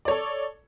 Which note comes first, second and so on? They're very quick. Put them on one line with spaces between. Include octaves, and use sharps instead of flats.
D5 C#5 A4